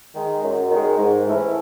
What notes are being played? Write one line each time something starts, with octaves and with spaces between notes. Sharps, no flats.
D#3 G#3
F#2
D#3 G#3
G#2
E3 A3 C#4 E4